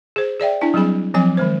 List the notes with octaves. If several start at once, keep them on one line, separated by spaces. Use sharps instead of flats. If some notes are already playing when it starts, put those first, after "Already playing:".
G#4 C5
G#4 D5 E5 G5
D4 E4 G#5
F#3 G3 C4 G#4 B5
F3 F#3 C4 G#5 D6
D#3 G#3 C5